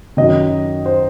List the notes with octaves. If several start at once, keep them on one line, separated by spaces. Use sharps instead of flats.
F#2 D#3 D#5
C5